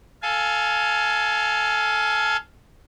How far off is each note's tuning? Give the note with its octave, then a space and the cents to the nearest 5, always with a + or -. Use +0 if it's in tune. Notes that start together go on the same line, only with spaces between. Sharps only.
A4 +0 F5 +0 G#5 +20